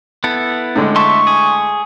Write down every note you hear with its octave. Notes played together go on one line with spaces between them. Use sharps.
B3 E4 A4
A2 D3 G#3
E5 A5 C6 C#6
G#4